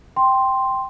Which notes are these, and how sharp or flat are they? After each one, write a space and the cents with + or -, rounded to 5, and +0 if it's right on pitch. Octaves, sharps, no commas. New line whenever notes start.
G5 +0 C6 +0